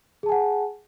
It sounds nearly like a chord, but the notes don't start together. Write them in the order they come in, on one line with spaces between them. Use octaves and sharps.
G#4 A5 G#5 F#5